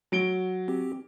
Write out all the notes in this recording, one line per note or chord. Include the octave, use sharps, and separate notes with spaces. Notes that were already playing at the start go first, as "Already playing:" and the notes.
F#3 D7 G7
C4 G4